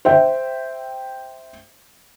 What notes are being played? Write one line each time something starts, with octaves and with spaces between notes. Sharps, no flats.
C5 E5 G5